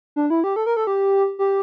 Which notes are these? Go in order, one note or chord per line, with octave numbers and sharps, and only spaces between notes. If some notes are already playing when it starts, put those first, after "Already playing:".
D4
E4
G4
A4
A#4
A4
G4
G4